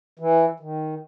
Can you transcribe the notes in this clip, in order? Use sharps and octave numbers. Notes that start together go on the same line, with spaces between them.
E3
D#3